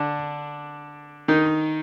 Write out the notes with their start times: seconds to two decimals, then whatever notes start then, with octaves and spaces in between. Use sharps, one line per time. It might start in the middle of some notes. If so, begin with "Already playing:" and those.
Already playing: D3 D4
1.28 D#3 D#4